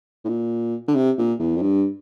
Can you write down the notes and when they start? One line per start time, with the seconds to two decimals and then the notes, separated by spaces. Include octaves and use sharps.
0.25 A2
0.29 A#2
0.88 D3
0.95 C3
1.18 A#2
1.39 E2
1.56 F2
1.62 G2